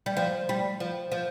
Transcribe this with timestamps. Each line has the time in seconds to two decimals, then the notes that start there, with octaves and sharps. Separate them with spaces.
0.06 G3
0.17 F3
0.49 G3
0.80 F3
1.12 F3